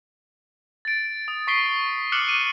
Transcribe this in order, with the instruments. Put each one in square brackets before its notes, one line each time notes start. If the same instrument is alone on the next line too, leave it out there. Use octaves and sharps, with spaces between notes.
[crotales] A6 D7
D#6
C#6 B6 C7 D7 G7
D6 F6 F#6 C#7 F#7 G7
D#7